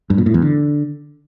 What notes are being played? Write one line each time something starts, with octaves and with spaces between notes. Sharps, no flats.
G2
A#2
A2
E2
D3